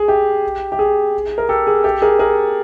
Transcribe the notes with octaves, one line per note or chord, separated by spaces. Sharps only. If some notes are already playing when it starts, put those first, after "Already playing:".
Already playing: G#4
G4
G4
G#4
A#4
G4 A4
G#4
G4 A4
G#4 A#4
G#4 A#4